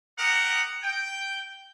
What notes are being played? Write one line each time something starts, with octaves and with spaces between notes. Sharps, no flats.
G4 A#4 D#5 F#5
G5